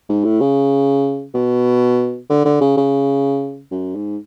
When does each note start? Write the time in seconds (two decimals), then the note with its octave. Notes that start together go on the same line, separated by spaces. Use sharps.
0.09 G#2
0.24 A2
0.41 C#3
1.34 B2
2.30 D3
2.45 D3
2.61 C#3
2.77 C#3
3.71 F#2
3.95 G#2